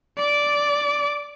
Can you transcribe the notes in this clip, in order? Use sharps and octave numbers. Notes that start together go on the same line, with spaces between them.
D5 D6